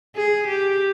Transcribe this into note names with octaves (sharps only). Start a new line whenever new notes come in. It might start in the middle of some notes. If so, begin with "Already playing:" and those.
G#4
G4